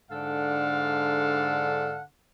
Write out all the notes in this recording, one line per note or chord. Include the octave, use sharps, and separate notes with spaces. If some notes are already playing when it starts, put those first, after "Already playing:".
G#2 D3 D4 A4 F5 F#5